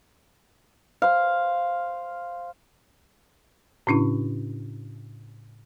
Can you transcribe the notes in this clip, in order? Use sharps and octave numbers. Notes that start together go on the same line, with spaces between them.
C5 F5
A2 C#3 C#4 D4 E4